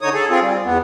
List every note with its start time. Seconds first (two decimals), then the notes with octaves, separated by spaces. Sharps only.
0.01 D3 D#4 C#5 D#6
0.14 G#4 A4
0.30 C4 F4 G#4
0.42 G3
0.65 E2 B3